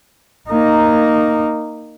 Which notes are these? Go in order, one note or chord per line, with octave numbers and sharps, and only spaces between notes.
A#3 D#4